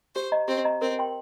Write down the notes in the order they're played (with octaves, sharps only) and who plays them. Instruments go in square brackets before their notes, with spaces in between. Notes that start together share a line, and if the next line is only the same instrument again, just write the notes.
[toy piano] G4 [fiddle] C5
[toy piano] D#5 A#5
[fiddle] C4 [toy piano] G4
[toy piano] D#5 A#5
[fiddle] C4 [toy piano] A#4
[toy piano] G5 C6